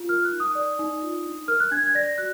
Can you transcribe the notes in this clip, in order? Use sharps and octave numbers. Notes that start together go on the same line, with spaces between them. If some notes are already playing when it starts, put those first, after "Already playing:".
Already playing: F4
A#4 F6
F#6
D#4
D#6
D5
D#4
F4
D4
A#4 F6
F#6
D4 G#6
G#6
D5 A#6
F#4 F#6